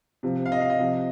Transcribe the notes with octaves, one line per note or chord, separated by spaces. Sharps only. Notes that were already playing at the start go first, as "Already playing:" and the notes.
C3 F3
F5
D#5
F5
D#5
C3 F3